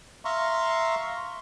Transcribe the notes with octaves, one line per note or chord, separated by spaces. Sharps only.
E5 F5 A#5 C6 C#6